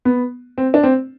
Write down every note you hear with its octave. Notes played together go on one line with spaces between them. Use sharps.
B3
C4
D4
C4